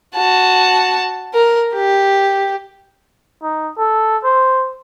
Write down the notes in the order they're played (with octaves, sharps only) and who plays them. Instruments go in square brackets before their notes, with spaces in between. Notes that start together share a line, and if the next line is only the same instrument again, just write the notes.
[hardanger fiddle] F#4 A5
A#4
G4
[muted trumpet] D#4
A4
C5